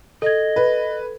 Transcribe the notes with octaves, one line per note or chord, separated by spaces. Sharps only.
A4 D#5 G#6
B4